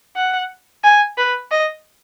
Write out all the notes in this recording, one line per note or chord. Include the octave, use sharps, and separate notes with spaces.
F#5
G#5
B4
D#5